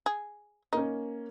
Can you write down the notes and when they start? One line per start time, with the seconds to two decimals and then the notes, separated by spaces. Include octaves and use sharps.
0.06 G#4
0.73 A#3 C#4 D#4